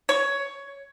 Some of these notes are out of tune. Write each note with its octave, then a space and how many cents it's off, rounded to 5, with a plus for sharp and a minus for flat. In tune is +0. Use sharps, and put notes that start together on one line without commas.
C#5 +10